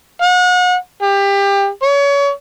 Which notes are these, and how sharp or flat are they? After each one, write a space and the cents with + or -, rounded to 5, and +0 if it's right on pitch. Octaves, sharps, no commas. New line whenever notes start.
F#5 -35
G4 +25
C#5 +30